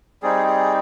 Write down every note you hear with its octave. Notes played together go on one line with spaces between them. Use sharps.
G3 C4 D#4 G#4
G#4